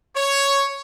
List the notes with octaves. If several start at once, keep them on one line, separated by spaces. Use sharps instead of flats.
C#5